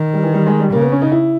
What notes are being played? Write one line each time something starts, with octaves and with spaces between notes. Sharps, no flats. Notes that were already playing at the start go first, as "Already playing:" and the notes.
Already playing: D#3
G3
E3
G3
G#3
G3
C#3 A#3
B3
C#4
D#4
E4